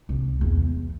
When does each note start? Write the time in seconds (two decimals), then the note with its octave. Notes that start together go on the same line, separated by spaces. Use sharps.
0.09 C2
0.41 E2
0.62 G3